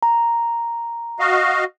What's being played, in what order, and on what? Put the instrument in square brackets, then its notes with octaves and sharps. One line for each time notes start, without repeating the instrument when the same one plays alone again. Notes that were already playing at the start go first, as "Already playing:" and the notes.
[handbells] A#5
[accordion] F#4 D#5 F5